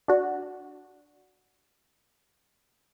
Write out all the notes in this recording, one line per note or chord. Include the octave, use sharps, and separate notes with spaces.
D4 F#4